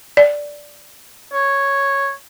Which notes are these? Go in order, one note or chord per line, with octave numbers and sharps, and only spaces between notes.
D5
C#5